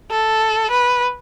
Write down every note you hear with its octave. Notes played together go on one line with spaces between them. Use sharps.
A4
B4